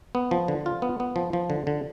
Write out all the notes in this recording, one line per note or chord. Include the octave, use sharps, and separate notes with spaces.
B3
F3
D3
F4
B3
B3
F3
F3
D3
D3